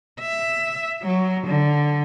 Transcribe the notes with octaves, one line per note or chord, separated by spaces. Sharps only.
E5
F#3
D3